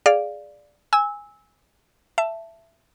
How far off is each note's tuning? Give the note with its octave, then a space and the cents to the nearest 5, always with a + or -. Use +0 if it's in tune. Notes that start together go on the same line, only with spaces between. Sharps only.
G#4 +0 D5 +0 F5 +0
G#5 -10 E6 -20
E5 +15 A5 +0